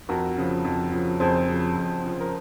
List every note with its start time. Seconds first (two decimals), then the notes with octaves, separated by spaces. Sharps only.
0.09 F2 F#4 A#4
0.37 C#3 F3
0.65 F2
0.92 C#3 F3
1.20 F2 G#4 C5
1.49 C#3 F3
1.76 F2
2.04 C#3 F3
2.20 A#4